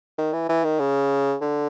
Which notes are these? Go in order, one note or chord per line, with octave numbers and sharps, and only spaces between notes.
D#3
E3
E3
D#3
C#3
D3